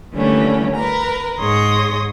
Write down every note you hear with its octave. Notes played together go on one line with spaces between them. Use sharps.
D3 E3 G3 A3 A#3 C#4
A#4 B4 A#5
G#2 G#4 C#5 C6 D#6 A#6